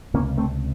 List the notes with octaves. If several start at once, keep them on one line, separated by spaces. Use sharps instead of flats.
C#2 C3 A#3 C#4
A3 C4